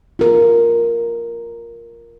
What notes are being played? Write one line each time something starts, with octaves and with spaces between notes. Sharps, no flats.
F4 A#4